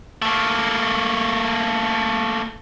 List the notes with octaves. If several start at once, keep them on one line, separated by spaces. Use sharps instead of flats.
A3 A#3